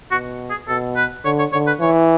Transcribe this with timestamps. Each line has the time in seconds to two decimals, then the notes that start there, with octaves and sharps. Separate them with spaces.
0.11 B2 F#4
0.50 G#4
0.68 B2 A4
0.96 B4
1.25 D3 C#5
1.39 C#5
1.52 D3 C#5
1.67 B4
1.81 E3 C#5